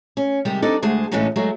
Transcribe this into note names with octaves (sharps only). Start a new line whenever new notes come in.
C#4
C3 D#3 G3 G#3 G4
C4 D4 D#4 A4 D5
D2 G#3 G#4 C5 A5
A2 D3 E3 G#3 C#4 D#4
F#3 G#3 A3